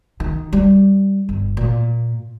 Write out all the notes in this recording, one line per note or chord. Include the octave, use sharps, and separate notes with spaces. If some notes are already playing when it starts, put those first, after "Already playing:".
D#3
G3
G1
A#2